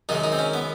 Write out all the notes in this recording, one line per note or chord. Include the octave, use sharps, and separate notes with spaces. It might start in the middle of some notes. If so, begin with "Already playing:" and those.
F#2 D#3 G#3 D#4
D#4
C4
C#4
B3